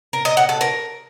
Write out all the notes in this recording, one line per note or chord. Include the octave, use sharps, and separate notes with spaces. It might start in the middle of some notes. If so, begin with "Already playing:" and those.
A#4
D#5
F#5
A4
A#4